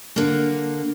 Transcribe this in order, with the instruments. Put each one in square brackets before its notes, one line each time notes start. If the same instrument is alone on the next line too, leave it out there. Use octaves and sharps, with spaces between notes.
[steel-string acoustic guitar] D3 A#3